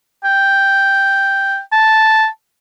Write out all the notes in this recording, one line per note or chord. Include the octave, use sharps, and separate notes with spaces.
G5
A5